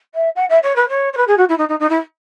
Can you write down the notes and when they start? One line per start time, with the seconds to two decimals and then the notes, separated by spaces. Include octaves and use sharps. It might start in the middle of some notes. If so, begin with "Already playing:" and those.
0.14 E5
0.35 F#5
0.49 E5
0.62 C#5
0.75 B4
0.88 C#5
1.13 C#5
1.17 B4
1.27 G#4
1.37 F#4
1.49 E4
1.58 D#4
1.68 D#4
1.79 D#4
1.89 E4